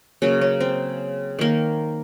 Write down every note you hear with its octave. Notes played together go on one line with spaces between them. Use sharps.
C#3 F#3 A#3 C#4
C#4
C4
D#3 A#3